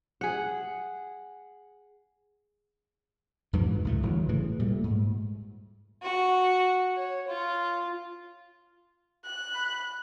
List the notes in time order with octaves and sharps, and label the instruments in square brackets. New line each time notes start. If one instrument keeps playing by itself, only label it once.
[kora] G#4 F#5
[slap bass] F2 G#2 B2 E3
C#2 A2 A3
G1 E3 F#3
A2 C#3 E3
A#2 G3 A3
G#2
[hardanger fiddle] F#4
C#5
F4
[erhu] F#6
[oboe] B5